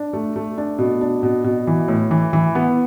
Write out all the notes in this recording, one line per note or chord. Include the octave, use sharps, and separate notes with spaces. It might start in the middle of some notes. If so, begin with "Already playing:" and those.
Already playing: D4
A3
A3
D4
B2
D4
B2
B2
E3
A2
E3
E3
B3